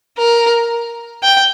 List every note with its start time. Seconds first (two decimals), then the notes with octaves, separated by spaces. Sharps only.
0.18 A#4
1.23 G5